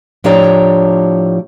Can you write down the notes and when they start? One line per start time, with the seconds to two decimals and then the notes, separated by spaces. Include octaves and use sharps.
0.24 A2 F3 D4 G4 C#5 A#5